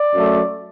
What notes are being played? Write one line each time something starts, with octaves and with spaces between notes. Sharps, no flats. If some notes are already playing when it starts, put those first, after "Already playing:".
Already playing: D5
F#2 F#3 A3